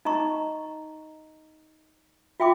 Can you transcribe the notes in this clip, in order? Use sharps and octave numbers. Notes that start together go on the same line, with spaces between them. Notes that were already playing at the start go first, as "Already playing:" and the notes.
D#4 D#5 A#5 C#6
F4 E5 G5 C6 D6